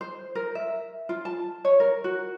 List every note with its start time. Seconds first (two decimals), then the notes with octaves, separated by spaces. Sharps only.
0.01 C5
0.35 A#4
0.55 E5
1.09 F4
1.25 A5
1.65 C#5
1.80 A#4
2.04 F#4